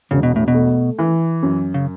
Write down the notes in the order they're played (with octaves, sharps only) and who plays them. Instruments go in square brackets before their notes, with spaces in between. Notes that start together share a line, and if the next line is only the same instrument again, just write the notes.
[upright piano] E1 [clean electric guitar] C#3
[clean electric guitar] B2
A2
B2
[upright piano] A3
E3
F#2
[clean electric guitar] C#3